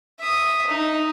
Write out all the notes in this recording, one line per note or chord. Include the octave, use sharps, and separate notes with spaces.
E5 D#6
D#4